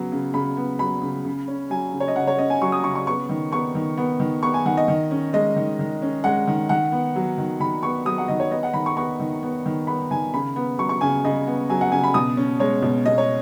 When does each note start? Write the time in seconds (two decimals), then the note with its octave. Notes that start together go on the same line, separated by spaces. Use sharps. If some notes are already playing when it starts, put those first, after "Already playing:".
Already playing: C#3 F#3 B3
0.12 C#3
0.34 C#3 B5
0.57 B3
0.79 F#3 B5
1.02 C#3
1.24 C#3
1.48 C#4
1.70 F#3 G#5
1.93 C#3
2.00 C#5
2.08 D#5
2.15 C#3 F#5
2.27 C#5
2.39 C#4 D#5
2.50 G#5
2.61 F#3 C#6
2.72 D#6
2.83 C#3 C#6
2.95 C#6
3.06 B3 C#6
3.29 D#3
3.52 B3 C#6
3.75 D#3
3.98 B3
4.20 D#3
4.43 B3 C#6
4.54 G#5
4.65 D#3 F#5
4.77 D#5
4.88 D#3
5.11 C#4
5.33 G#3 D#5
5.56 D#3
5.79 D#3
6.02 C#4
6.24 G#3 F#5
6.47 D#3
6.69 D#3 F#5
6.92 B3
7.16 F#3
7.38 D#3
7.60 D#3 B5
7.83 B3 C#6
8.05 F#3 D#6
8.18 F#5
8.28 D#3 D#5
8.40 C#5
8.51 B3 D#5
8.63 F#5
8.74 D#3 B5
8.86 C#6
8.97 B3 C#6
9.20 D#3
9.43 B3
9.66 D#3
9.87 B3 B5
10.11 D#3 G#5
10.34 C#3 B5
10.56 B3
10.78 F#3 C#6
10.89 C#6
11.01 C#3 G#5
11.25 C#3 D#5
11.47 B3
11.70 F#3 G#5
11.81 F#5
11.91 C#3 G#5
12.04 B5
12.14 B2 D#6
12.37 C#4
12.60 G#3 C#5
12.82 B2
13.06 B2 D#5
13.18 C#5